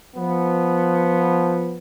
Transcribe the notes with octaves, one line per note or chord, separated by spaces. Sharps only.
F3 B3